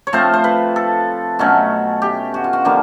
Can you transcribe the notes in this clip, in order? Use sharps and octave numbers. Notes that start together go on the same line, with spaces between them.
C#5
F3 A3 C4 F4 C5
C5
B4
A4
B2 F#3 A3 C#4
G4
F#4
F4
F#4
D3 F3 A#3 D4 G4